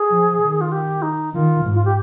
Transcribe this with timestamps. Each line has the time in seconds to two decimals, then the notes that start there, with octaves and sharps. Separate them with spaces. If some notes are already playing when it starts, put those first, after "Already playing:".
Already playing: G#4
0.10 F3
0.41 D#3
0.61 F4
0.72 G4
1.02 D#4
1.34 D#3 F4
1.64 G#2
1.74 F4
1.85 G4